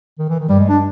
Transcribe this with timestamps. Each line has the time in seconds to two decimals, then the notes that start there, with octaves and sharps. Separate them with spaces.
0.19 D#3
0.29 E3
0.39 D#3
0.49 G2 G3
0.59 G#3
0.69 D4